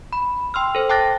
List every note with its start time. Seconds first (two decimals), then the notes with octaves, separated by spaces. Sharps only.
0.13 B5
0.54 G5 C6 E6 F6
0.75 A4 C5
0.89 G5 A5 D6 F#6 A6 A#6